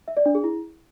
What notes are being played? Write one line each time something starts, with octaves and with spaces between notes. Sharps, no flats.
E5
D5
D4
G#4
E4